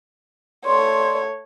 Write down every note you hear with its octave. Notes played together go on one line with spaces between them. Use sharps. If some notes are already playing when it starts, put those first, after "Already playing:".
A3 C#5 D5 C6